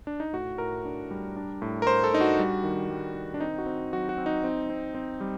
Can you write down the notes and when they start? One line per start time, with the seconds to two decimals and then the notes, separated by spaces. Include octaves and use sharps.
0.07 D4
0.20 D#4
0.33 A2 F#4
0.58 A2 A#4
0.85 D4
1.11 G3
1.36 D4
1.62 A2
1.82 A#4
1.87 A2 C5
2.04 A4
2.13 D4 D#4
2.21 F#4
2.39 G3
2.64 D#3
2.90 G3
3.15 D#3
3.34 D4
3.40 C4 D#4
3.58 F#4
3.66 C4
3.93 F#3 F#4
4.09 F#4
4.18 C4
4.26 D#4
4.44 C4
4.70 C4
4.94 C4
5.21 G3